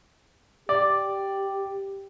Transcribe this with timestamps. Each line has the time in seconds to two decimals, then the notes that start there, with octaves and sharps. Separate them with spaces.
0.69 G4 D5